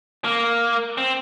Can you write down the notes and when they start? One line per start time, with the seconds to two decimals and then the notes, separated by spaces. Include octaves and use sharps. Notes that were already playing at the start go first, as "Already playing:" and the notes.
0.24 A#3
0.98 C4